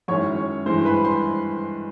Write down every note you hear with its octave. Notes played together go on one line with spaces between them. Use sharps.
F#2 D#3 G#3 C#4 E4 C#5 C#6
G2 E3 G#3 C5 C6
B4 B5
C5 C6